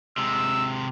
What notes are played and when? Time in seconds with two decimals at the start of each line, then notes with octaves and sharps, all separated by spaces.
0.18 C3 G#3 E6